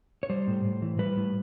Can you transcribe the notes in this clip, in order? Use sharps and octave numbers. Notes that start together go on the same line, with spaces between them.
C#5
G3 C5
A2
A2
E3
G3 B4
A2